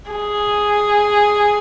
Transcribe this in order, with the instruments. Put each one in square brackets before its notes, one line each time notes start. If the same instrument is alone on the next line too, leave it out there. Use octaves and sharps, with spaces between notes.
[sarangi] G#4